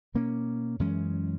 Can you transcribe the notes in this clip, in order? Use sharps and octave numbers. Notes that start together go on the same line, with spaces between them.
B2 A#3 C#4
F#2 E3 G#3 C#4